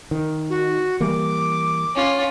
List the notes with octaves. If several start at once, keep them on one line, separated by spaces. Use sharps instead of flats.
D#3
F#4
E3 G3 A#3 D6
C#4 F4